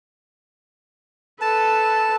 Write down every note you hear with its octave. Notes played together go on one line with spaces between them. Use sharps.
A4 B4 A5